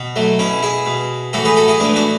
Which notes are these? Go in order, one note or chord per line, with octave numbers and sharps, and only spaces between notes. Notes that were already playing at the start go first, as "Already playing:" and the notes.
Already playing: B2
F#3 A3
B2 C#4 E4
E4 G#4
B2
A2 E3 F#4 A4
G#4 B4
F#4 A4
E4 G#4
A2 E3 B3 D4
D4 F#4